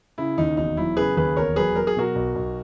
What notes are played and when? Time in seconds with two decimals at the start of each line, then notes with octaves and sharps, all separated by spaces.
0.18 C#3 E4
0.38 D#2 D#4
0.57 E1 D#4
0.77 F#3 E4
0.97 C#3 G#4 B4
1.16 D#2 G#4 B4
1.36 E1 A#4 C#5
1.56 F#3 G#4 B4
1.76 F#3 A#4
1.87 G#4
1.96 B2 F#4 A#4
2.15 B1
2.35 B1